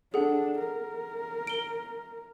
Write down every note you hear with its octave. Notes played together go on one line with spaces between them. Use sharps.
D4 G#4 A4 F#5
A#4
D7 G7